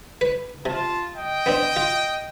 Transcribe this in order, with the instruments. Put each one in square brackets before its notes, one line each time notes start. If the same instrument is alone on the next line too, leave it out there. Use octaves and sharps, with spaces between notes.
[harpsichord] B4
[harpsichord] C3 [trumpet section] F4 A5
[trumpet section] D#5 G5
[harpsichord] B3 C4 D4
F4